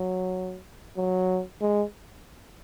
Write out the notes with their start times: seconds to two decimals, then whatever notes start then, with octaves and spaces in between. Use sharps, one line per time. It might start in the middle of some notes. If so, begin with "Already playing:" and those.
Already playing: F#3
0.97 F#3
1.61 G#3